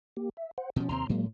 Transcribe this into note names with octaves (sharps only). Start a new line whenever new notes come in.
A#3 G4
E5
C5 F#5
B2 F3 C#4
D#2 C3 C4 A#5 C6 F6
A2 F#3 G#3 A#3